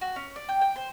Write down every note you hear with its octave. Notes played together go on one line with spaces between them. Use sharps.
F#4
C#4
D5
G5
G5
C5